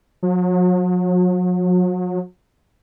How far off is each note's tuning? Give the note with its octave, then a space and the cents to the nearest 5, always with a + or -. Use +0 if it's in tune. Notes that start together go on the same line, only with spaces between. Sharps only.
F#3 -40